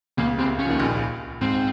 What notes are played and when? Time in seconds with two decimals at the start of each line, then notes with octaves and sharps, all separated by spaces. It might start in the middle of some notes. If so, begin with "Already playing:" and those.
0.18 C#2 C#3 A#3
0.38 C2 C3 C4
0.59 C#4
0.65 F3
0.69 D#2 D#3
0.79 A#1 A#2
1.41 G#2 C4